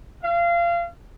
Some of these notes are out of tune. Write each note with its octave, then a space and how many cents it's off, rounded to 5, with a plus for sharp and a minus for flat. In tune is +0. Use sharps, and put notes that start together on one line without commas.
F5 -25